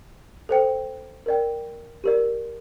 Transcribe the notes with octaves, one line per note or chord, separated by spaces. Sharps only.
A4 C5 G5
A#4 D5 G5
G4 A#4 D5